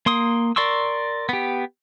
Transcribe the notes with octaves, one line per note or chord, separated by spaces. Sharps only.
A#3 C6 D#6
A#4 D5 C6 C#6 E6
B3 G4